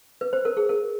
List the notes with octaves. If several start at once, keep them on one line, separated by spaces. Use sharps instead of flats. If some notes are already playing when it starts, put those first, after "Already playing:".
B4
C5
A#4
G#4
A#4